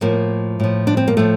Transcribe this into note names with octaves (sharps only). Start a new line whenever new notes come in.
A2 F3 A#3
A2 F3
D4
C4
A#3
A2 F3 A3